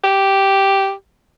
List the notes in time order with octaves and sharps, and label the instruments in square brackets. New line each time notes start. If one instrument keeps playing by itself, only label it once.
[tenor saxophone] G4